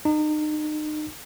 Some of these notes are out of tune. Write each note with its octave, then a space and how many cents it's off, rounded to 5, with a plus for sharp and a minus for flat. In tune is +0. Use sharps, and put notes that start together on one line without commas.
D#4 -35